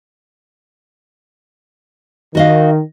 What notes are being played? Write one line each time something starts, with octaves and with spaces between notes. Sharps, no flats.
D#3 F#4 D#5 F5